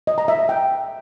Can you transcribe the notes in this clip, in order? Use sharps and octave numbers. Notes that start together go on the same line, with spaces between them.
D#5
A#5
E5
E5
G5